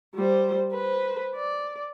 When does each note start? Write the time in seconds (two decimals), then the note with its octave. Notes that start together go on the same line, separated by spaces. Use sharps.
0.15 G3 C5
0.72 B4 C5
1.35 D5